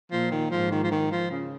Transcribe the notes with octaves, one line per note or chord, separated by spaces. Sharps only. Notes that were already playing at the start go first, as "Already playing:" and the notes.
A#2 F3
D#3
G#2 F3
D#3
F3
D#3
F3
C#3